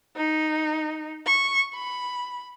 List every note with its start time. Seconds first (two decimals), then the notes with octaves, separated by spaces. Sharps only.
0.16 D#4
1.26 C#6
1.74 B5